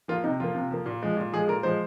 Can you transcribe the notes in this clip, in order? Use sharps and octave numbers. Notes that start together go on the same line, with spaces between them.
F3 A#3 F4
C3 D#4
F3 A#3 F4
C3
F3 A#3
A#2
F3 G#3
A#2
F3 G#3 G#4
A#2 A#4
F3 G#3 C5